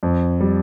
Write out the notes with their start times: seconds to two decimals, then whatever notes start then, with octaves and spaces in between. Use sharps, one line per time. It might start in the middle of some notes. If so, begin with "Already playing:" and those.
0.03 F2
0.41 G3